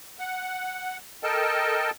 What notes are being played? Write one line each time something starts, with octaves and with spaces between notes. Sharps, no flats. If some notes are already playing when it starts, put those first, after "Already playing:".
F#5
A4 A#4 D#5 G5 A5